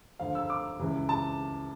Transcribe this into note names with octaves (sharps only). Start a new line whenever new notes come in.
D2 D3 F3 F5
E6
D6
C#2 C#3 E3
A5